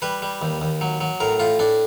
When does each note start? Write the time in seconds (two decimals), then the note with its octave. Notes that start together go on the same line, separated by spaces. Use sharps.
0.02 G3 B4
0.22 G3
0.42 D#2
0.62 D#2
0.81 F#3
1.01 F#3
1.20 A2 A#4
1.40 A2 F4
1.59 A2 D4